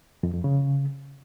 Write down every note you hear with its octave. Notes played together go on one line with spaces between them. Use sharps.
F2
F2
C#3